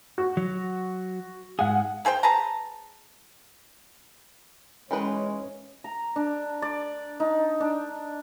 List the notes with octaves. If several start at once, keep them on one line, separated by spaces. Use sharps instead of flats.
F#4
F#3
G#2 G#4 F5 F#5
A#3 G#4 C5 G5
G#4 B4 A5 A#5
E3 G#3 C#4 D#4 B4
A#5
D4
D5
D#4
D4